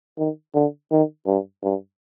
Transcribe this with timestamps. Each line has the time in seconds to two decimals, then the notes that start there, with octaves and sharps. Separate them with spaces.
0.18 D#3
0.55 D3
0.91 D#3
1.26 G2
1.63 G2